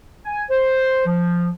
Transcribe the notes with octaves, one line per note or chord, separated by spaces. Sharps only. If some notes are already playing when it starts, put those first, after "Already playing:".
G#5
C5
F3